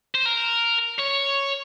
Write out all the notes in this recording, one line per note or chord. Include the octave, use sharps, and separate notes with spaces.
C5
A#4
C#5